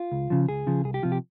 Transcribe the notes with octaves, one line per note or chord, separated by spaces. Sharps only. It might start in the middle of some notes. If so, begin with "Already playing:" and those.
Already playing: F4
C#2
C#3 F3
C#2 G#4
C#3 F3
C2 G#4
G4
C3 F3 F4
G4